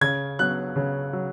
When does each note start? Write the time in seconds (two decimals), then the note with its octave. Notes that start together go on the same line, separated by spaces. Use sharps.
0.01 C#3 G#6
0.39 F#3 B3 F#6
0.76 C#3
1.13 F#3